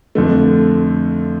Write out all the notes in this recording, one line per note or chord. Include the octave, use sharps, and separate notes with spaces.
F2 D3 A3